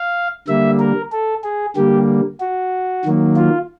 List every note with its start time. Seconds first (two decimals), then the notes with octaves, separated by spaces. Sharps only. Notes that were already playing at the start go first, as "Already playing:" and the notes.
Already playing: F5
0.48 D3 G3 A#3 E5
0.80 A#4
1.12 A4
1.44 G#4
1.76 D3 G3 A#3 G4
2.40 F#4
3.05 D#3 F#3 A#3
3.36 F4